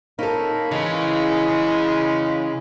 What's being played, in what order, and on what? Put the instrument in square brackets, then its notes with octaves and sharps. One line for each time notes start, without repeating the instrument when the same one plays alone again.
[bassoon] A#3 [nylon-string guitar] D#4 A4 [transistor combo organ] C#5 F5 B5
[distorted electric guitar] C#3 [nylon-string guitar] E3 [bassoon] G#3